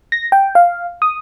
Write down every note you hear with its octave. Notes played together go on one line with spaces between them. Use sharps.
A#6
G5
F5
D#6